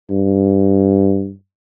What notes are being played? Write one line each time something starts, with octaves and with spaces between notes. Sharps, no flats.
G2